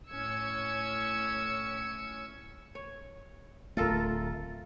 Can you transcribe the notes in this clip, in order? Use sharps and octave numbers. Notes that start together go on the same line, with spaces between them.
A2 C#4 E6 G#6 C#7
C#5
D1 A3 F4 A4 A#4